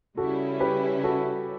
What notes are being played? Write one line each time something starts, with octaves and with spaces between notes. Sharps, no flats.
C#3 G3 C#4 E4 F#4 A4
G4 B4
F#4 A4